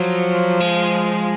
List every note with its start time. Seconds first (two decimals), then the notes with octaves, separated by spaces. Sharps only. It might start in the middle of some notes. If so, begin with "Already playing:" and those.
Already playing: F3 F#3
0.60 G#3